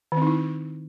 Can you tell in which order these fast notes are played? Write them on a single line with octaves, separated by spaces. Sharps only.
D#3 C4 D#4 E4